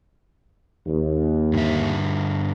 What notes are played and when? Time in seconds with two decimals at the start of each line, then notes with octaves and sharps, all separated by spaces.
0.86 D#2
1.53 G2 D3 E5